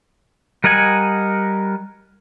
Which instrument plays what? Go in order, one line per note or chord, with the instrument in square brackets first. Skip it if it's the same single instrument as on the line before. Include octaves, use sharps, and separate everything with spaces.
[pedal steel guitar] G3 A#4 D#5 F#5 G#5